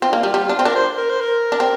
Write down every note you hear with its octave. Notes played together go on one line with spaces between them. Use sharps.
C4 F4
D4
A#3 F4
G3
G3
D4
C4
D4 A#4
C5
A#4
C5
A#4
D4
C4